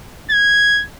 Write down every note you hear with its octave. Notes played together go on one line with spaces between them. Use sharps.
G#6